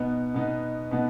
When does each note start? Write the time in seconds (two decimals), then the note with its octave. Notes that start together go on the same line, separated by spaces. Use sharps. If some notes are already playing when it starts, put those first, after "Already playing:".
Already playing: B2 B3 D#4
0.34 B2 B3 D#4
0.91 B2 B3 D#4